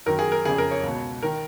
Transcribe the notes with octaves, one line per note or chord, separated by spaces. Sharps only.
F#2 D#3 A#4
G#4
A#4
F2 C#3 G#4
A#4
C#5
C#2 B2
D#3 A#4